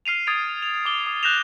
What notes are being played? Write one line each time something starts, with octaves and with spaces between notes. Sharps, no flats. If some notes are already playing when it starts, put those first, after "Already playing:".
F6 C7 D#7 F7
D#6 G#6 A6 D7 F7
F7
D6 G7
D#6
F#6 G6 A#6 E7 F7